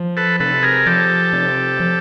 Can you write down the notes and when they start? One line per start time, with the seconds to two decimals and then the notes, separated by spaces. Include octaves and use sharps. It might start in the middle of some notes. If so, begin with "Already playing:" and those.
Already playing: F3
0.17 A4 B4
0.40 C3 A4 B4
0.63 G#4 A#4
0.86 F3 G4 A4
1.33 C3
1.80 F3